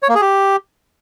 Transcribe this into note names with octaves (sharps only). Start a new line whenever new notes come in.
C#5
A#3
G#4
G4